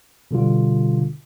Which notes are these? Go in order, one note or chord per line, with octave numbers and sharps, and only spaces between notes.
B2 D3 G3 F4